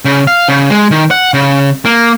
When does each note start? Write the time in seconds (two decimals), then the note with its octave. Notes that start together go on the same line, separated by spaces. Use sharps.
0.05 C#3
0.27 F5
0.48 C#3
0.70 G#3
0.91 D#3
1.11 F#5
1.34 C#3
1.85 A#3